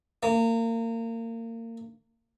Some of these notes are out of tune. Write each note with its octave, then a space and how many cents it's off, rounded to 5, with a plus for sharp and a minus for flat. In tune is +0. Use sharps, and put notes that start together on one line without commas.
A#3 -30